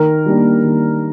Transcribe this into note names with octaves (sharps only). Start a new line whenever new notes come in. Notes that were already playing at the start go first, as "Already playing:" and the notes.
Already playing: D#3 A#4
G3 A#3 D4
D#3